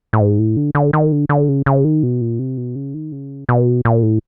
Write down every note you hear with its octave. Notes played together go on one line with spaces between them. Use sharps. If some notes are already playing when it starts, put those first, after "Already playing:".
A2
G#2
A2
D3
D3
D#3
D3
D3
C#3
C#3
D#3
B2
A#2
C3
B2
C#3
D#3
C#3
B2
A#2
A2